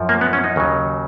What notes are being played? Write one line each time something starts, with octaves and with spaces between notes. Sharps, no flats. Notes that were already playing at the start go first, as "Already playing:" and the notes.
Already playing: F#2 F3
A#3
B3
C#4
D#4
D#2 C#3 F#3